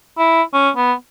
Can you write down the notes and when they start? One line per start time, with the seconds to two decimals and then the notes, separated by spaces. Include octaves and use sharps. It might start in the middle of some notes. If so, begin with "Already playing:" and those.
0.18 E4
0.53 C#4
0.76 B3